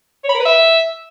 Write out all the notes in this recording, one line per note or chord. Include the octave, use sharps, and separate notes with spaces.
C#5
B5
A#4
B4
E5